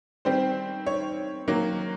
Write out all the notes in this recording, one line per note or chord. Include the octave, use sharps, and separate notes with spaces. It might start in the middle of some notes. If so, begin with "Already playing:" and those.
D#3 G3 C4 C5
C#5
D#3 F#3 A#3